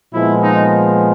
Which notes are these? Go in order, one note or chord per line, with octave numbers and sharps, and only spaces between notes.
A#2 F3 G#3 B3 E4
D#4